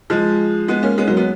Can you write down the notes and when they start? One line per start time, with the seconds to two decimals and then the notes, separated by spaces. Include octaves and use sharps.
0.10 F3 G#3
0.68 G#3 B3
0.83 A#3 C#4
0.98 G#3 B3
1.08 F#3 A#3
1.17 G#3 B3